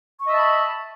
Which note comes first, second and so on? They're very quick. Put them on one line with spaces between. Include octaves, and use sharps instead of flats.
C#6 D#5 E5 A5 B5